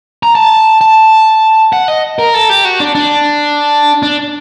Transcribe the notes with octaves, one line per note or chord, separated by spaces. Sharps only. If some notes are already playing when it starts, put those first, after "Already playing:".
A#5
A5
A5
F#5
D#5
A#4
A4
G4
F#4
D4
D4
D4